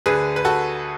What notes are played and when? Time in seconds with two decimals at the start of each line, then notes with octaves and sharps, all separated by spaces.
0.06 D2 D3 G#4 B4
0.36 B4
0.45 F#4 A4